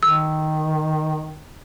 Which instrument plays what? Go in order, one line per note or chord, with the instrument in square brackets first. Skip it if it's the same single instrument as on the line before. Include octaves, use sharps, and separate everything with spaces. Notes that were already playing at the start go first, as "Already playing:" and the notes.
[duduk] D#3 [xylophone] E6